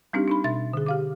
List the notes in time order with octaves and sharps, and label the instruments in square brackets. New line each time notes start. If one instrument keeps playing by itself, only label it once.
[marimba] G3 C4 D4 D#4 G4
D4 D#4 B5
B2 E5 C6 A6
D3 G#4
G4 F5 D6